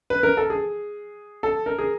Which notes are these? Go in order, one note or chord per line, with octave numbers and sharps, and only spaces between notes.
B4
A#4
A4
G#4
A4
A#4
G#4